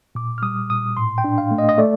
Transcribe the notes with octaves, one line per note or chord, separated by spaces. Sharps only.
A#2 D6
F6
G3 D#6
A#2 D#6
A2 C6
G5
D4
F5
A3
D#5
D#5
A3 D5